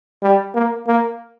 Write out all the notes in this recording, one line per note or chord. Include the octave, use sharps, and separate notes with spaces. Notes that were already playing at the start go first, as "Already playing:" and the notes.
G3
A#3
A#3